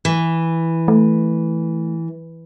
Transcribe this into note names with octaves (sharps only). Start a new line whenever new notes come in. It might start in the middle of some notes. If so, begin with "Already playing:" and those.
E3
A3